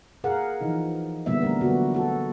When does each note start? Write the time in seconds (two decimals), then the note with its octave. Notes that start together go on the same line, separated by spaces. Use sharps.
0.24 G#4 A#4 F5 F#5
0.61 E3 F3 D#4
1.26 A#2 D3 G3 B3 E5
1.42 G3 A3 A#4
1.61 D3 F#3 B3 F#4
1.94 F#4 A4